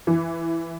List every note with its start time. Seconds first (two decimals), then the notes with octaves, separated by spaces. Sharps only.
0.07 E3